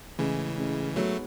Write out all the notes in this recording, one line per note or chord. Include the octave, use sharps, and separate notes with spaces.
A2 C#3 E3 G#3 C#4
A2 G#3 C#4
G#2 F#3 G#3 A3 B3 F#4 C#5